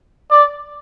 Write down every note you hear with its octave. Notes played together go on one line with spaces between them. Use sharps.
D5